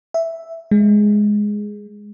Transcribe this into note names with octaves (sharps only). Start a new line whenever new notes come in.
E5
G#3